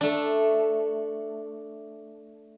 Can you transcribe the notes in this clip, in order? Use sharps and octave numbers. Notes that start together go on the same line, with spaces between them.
A3 D4